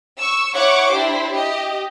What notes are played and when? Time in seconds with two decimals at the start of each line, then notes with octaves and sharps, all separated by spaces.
0.19 C#6 E6
0.54 E4 C#5 F#5 C#6 D6
0.91 D4 E4 G4 C5
1.31 G4 D#5